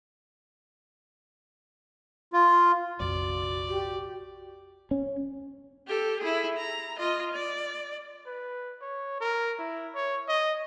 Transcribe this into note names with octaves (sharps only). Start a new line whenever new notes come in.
F4
F1 A#1 F2 F#4 D5
G4
C#4
G4 A4
E4 G#4
A#5
F4 D#5
D5
B4
C#5
A#4
E4
C#5
D#5